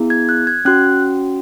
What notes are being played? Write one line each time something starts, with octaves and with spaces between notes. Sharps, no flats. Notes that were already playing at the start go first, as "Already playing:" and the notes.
Already playing: B3 E4 G#4
G#6
F#6
G#6
C#4 F#4 F#6